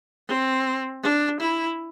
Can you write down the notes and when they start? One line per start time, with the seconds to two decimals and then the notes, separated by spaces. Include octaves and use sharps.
0.28 C4
1.03 D4
1.40 E4